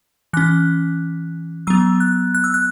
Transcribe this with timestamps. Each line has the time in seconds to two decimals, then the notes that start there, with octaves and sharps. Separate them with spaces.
0.33 E3 C#4 F#6
1.67 F#3 B3 E6
2.00 F#6
2.35 F#6
2.44 E6
2.54 F#6